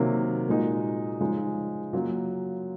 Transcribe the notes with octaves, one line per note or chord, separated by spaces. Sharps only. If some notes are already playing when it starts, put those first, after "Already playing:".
Already playing: C3 D#3 F#3 A#3 C#4
A#2 G#3 D#4 F#4
C#3 F3 G#3 D#4
C#3 F#3 A#3 F4